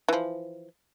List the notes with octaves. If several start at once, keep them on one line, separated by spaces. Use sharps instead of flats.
E3 F3